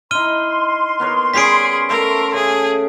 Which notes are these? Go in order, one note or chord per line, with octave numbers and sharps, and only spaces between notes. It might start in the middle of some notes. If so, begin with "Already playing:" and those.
D#4 E4 C6 F6 D#7 G7
B3 A#4 C#5
G3 C#4 G#4 B6 C7 D7
A3 A4 A#4 E5
C#3 G#4